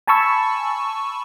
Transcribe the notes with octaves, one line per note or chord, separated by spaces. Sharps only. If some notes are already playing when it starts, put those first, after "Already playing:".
G#5 A5 B5 C#6 E6